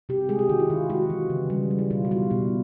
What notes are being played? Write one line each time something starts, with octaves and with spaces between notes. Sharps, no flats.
C3 G4
G#3 G#4
G4
D#3 F#4
E4
D#3 F4
G#3 F#4
E3
C#3
G3
G3
E4
B2 F4
F#4
G3 F4
B2 E4